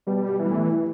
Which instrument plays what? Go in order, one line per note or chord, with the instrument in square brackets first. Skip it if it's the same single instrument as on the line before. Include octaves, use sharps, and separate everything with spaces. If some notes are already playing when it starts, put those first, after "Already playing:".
[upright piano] B2 B3 [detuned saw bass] G3
[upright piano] B2 B3
[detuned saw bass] E3
[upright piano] G3
A2 A3
E3